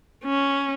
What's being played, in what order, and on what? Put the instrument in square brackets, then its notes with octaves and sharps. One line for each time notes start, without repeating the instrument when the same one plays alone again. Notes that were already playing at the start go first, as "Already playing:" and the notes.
[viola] C#4